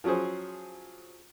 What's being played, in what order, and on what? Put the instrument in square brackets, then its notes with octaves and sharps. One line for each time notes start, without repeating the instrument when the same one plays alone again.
[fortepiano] F3 F#3 C#4 G#4 C5